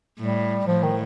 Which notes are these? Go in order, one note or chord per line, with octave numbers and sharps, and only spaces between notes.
A2 G3
A2 F3
D#3